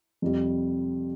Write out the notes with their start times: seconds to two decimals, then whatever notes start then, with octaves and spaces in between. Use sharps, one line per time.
0.22 F2 C3 G3